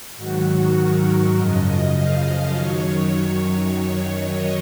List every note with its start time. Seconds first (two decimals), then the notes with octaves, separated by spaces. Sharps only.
0.16 G#2 D#3 F#3 F#4
0.75 A#4
1.34 F#2 C#3 F3 D#5
1.93 F5
2.52 F#2 D#3 F#3 C#5
2.81 C#5
3.70 F#2 D#3 F#3 C#5
4.29 D#5